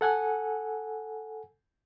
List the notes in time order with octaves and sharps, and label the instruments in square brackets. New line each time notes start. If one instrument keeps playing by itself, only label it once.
[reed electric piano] A4 F#5 G#5